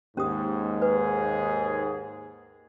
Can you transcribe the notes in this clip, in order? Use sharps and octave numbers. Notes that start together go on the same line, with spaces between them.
D#2 G#2 C#4 G4 D#6
G#4 B4